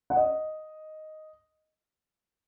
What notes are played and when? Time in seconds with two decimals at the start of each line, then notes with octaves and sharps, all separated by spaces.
0.10 F#5
0.16 D#5